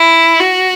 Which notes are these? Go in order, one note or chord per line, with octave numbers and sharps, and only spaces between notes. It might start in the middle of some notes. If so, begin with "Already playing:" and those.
Already playing: E4
F#4